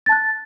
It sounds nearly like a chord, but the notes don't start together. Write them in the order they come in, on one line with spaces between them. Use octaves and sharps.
A6 A5 F#6